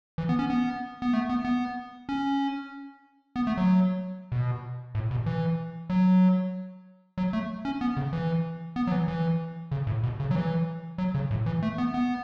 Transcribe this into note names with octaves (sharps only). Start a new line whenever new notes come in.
E3
B3
C#4
B3
B3
A3
B3
B3
C#4
B3
A3
F#3
B2
A2
B2
E3
F#3
F#3
A3
C#4
B3
C#3
E3
B3
F#3
E3
E3
C#3
A2
B2
C#3
F#3
E3
F#3
C#3
A2
E3
A3
B3
B3